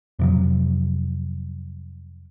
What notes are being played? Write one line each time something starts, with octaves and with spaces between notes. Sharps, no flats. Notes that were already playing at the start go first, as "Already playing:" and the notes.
F2 C3 F#3